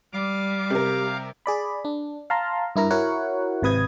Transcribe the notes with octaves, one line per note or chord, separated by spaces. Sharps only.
G3 F5 D6
C3 G4 A#4
G#4 D5 B5
D4
F5 A5 A#5 C6
G2 E4 A#4 A#5
E4 F#4 A#4 C#5 F#5
G#1 C3 B4 D#6 G#6